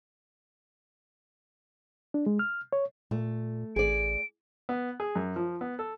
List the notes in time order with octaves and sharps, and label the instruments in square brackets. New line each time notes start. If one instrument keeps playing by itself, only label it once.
[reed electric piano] D4
G#3
F6
C#5
[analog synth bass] A#2 [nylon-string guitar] A3
[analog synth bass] A1 [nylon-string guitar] G#4 D5 [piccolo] D7
[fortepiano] B3
G#4
F#2
F3
B3
A4